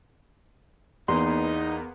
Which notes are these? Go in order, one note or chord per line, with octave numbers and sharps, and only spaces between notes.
E2 A#3 B3 D#4 C6